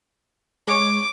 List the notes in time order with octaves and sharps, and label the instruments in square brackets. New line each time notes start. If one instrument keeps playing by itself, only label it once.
[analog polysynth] G#3 C#5 [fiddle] D6